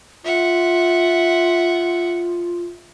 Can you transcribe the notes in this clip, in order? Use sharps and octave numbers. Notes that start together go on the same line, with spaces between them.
F4 E5 F#5